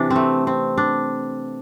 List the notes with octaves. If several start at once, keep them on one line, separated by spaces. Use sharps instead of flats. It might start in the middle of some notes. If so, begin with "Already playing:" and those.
Already playing: C3 E3 D4
C4
A3
C4
D4